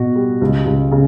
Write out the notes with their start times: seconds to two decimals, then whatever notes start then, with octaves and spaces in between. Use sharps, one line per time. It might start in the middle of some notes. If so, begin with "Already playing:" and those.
Already playing: B2 F#4
0.15 G3
0.41 C#2
0.66 C#2
0.91 C#3